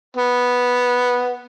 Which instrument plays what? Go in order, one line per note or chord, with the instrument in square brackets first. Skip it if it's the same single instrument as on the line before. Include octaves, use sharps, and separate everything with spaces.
[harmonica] B3